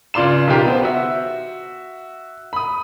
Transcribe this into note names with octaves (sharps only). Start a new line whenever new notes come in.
C#2 F4 D5 C6 E7
B1 D#3 F4 G4 A#4
B3 C5
F#4 E5
B5 D#6